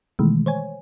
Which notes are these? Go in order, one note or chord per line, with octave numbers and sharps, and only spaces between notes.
B2 D#3 E3 G#3 A3
C5 C#5 G#5